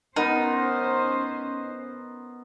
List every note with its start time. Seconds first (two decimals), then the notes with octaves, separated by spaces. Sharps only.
0.16 B3 C#4 D#4 A#4 C5